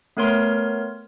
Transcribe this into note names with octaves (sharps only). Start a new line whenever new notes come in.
A3 B3 A#4 C#5 C6 F6